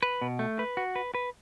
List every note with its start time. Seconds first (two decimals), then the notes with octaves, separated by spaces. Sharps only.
0.03 B4
0.21 B2
0.39 A3
0.59 B4
0.77 F#4
0.96 B4
1.14 B4